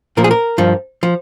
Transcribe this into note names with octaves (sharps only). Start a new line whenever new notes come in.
A#2 F3 A#4
G#4
A#4
G2 F3
F3